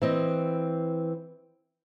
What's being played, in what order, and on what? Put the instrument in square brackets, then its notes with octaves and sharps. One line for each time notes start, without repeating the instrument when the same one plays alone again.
[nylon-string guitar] E3 C4 D#5